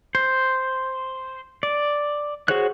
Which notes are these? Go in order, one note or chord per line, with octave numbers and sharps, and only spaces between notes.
C5
D5
F#4 G#4 C5 C#5 F#6